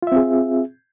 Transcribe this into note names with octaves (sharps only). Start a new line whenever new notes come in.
C4 F4 G#4 E5